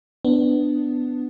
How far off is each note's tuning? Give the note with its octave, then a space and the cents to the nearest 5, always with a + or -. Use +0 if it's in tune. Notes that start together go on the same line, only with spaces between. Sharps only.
B3 +15 D4 +5